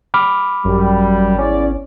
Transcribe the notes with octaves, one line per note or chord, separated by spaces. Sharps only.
B5 D6 F6
G#1 F#2 G3
E2 C#4 D5